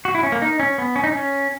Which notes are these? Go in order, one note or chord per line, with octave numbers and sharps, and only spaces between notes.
F#4
E4
C#4
A#3
D#4
C#4
B3
C#4
D#4
C#4